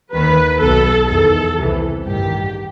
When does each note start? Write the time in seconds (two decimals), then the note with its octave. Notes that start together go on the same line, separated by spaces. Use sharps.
0.13 D#2 D#3 B4
0.61 B1 B2 A4
1.09 E2 D#3 A4
1.57 C2 C3 E3
2.05 A1 G2 D#3 G4